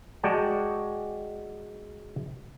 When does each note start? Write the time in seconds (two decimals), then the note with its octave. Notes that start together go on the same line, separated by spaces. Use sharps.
0.23 G#3 F#4 D5 G5 A5